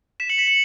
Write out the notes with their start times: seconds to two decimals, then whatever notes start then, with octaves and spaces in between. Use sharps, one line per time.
0.20 B6 E7
0.29 C#7 F#7
0.38 B6 E7
0.47 C#7 F#7